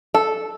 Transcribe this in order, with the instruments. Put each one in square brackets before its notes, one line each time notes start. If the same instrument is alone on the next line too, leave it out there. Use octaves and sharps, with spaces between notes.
[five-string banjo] A4